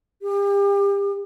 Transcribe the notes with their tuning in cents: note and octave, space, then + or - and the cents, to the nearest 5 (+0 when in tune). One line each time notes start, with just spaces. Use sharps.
G4 +35